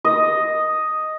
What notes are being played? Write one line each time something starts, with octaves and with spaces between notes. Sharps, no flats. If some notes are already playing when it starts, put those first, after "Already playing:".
D#5